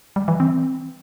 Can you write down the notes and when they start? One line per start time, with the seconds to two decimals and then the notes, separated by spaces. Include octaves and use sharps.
0.16 G3
0.28 E3
0.40 C4